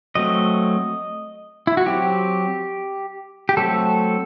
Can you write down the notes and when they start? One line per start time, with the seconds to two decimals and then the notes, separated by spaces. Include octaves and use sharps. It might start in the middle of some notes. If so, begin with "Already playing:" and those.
0.15 F#3 A3 C4 D#5
1.67 E4
1.77 F#4
1.86 F#3 C4 G4
3.49 G4
3.57 F#3 A3 C4 A4